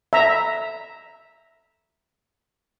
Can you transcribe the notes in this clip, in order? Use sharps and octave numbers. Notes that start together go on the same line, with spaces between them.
E5 A#5